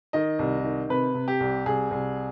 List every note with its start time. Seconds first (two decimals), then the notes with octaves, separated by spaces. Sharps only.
0.13 D#3 D#5
0.39 C2
0.64 D#3
0.89 C3 B4
1.14 C3
1.28 G4
1.40 C2
1.66 C2 G#4
1.91 C2